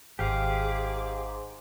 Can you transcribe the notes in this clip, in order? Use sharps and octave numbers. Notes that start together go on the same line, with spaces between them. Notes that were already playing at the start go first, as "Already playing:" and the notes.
G#1 G#2 G4 G#4 F5 D6